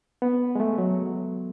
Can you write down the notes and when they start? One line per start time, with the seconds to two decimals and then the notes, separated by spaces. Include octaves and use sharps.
0.22 B3
0.55 G#3
0.60 A3
0.78 F#3